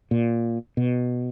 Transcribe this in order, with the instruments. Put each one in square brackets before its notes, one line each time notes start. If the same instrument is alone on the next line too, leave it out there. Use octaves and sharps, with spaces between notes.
[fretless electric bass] A#2
B2